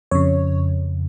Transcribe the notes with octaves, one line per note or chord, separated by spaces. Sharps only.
F2 C#3 C#5